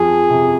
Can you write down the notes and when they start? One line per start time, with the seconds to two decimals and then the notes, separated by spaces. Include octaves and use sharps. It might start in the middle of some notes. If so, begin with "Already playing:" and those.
Already playing: F2 F3 G#4
0.30 C3